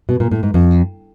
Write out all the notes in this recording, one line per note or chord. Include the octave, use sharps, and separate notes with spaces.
B2
A#2
A2
G#2
F2